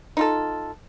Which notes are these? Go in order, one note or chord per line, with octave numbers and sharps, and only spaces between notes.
D#4 F4 A4